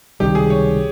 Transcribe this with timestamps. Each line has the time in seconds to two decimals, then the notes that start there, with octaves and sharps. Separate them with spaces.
0.20 C#2 C3 D#3 G3 G4
0.35 G#4
0.50 C#5